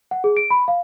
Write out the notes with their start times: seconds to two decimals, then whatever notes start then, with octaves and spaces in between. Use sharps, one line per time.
0.11 F#5
0.24 G#4
0.37 D7
0.50 B5
0.68 F5